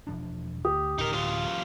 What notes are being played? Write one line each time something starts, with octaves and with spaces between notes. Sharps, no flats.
E1 F3 D4
D2 G4 D#6
D1 D#4 A#4
F#2 F4